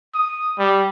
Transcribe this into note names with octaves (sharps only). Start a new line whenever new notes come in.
D#6
G3